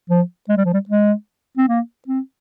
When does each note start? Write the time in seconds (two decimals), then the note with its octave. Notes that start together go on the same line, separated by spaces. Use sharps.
0.10 F3
0.49 G#3
0.57 G3
0.65 F3
0.74 G3
0.89 G#3
1.58 C4
1.68 A#3
2.08 C4